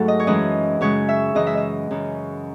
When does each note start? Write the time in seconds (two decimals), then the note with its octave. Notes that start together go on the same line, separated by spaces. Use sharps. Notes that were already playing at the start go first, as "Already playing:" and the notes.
Already playing: G#2 F#3 A3 F#4 A4
0.08 D#5
0.20 C#5
0.27 F#2 E3 G#3 D#5
0.81 F#2 C#3 G#3 C#5
1.09 E5
1.35 F#2 C#3 E3 D#5
1.47 E5
1.57 D#5
1.91 F#2 C#3 E3